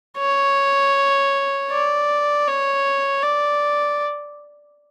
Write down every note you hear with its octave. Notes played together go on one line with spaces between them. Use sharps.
C#5
D5
C#5
D5